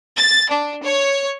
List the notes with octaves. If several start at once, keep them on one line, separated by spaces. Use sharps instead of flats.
A6
D4
C#5